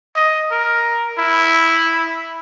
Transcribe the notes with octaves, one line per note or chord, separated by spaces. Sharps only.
D#5
A#4
E4